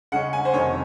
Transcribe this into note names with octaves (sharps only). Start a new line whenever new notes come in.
C#3 G#3 C#4 F#5
G#5
C5
F2 C3 D#3 C#5